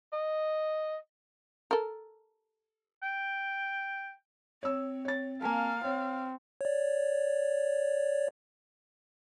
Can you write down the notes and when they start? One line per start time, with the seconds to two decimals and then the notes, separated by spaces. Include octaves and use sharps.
0.13 D#5
1.71 A4 A#4
3.03 G5
4.63 C4 C#5 E6
5.05 C#5 A6
5.42 A#3 F5 G#5 A5
5.84 C4 C#5
6.61 C#5 D5